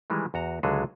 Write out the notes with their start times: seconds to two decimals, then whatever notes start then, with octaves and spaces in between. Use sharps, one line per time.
0.10 D#3 E3 G3 G#3
0.34 E2 F#4 A#5
0.63 C#2 D3 F#3 G#3 G#4 A4